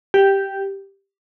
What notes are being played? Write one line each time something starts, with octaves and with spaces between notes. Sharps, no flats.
G4